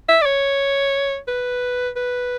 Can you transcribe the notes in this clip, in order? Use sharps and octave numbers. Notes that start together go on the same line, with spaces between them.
E5
D5
C#5
B4
B4